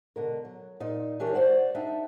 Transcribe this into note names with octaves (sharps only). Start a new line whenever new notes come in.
B2 D3 A#4
F#3
A#2 D#4
E3 D4 G4 A#4 C#5
F#4 C5 D5 F#5
D4 D#4 E5 G5